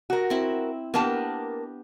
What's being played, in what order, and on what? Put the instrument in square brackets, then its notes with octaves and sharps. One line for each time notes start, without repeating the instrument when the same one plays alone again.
[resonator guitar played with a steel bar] F#4 A#4
[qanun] C4 E4
[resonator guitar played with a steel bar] A#3 A#4 A5 [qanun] B3 D4 G4